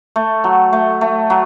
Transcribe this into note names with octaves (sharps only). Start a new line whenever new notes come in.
A3
F#3
A3
A3
F#3